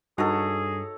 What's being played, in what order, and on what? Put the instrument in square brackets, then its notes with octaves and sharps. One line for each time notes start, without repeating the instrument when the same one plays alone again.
[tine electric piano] G2 [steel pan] D#4 F#4 [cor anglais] G#4 [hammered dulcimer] A4 C#5 A#5